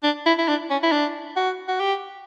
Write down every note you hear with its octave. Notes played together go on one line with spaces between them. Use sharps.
D4
E4
E4
D4
C#4
E4
D4
F#4
F#4
G4